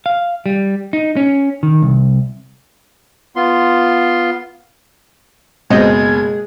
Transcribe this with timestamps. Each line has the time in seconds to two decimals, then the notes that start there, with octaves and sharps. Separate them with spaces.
0.06 F5
0.46 G3
0.93 D#4
1.17 C#4
1.63 D#3
1.83 C2
3.36 B3 F4 C6
5.70 F#1 B2 G#3 C4 G#4 D#5 G6 G#6